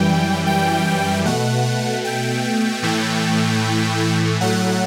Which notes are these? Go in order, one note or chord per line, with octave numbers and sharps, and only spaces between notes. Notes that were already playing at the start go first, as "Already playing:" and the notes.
Already playing: F#2 E3 G3 G5
G5
B2 A3 F#5
G5
A2 E3 A3
A2 F#3 A3 F#5